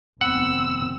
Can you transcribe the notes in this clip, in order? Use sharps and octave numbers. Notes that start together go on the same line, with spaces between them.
F1 D#2 B3 C4 F#5 G5 E6